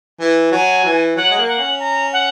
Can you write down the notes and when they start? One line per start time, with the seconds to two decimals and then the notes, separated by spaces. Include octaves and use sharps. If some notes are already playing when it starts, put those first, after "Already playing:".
0.20 E3
0.52 F#3 G#5
0.85 E3
1.16 F#3 F#5
1.31 G#3
1.38 A#3
1.48 F#5
1.59 C#4
1.80 A#5
2.13 F#5